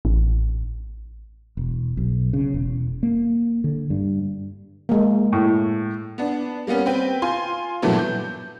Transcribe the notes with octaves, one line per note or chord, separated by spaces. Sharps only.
A1
E1
B1
C#3
E1
A#3
D3
G2
G#3 A#3
A2
B3 D4
G3 A#3 B3 C#4
C4 B4 G5
F4 G#5 C6
G2 A#2 E3 F#3 A3 B3
G6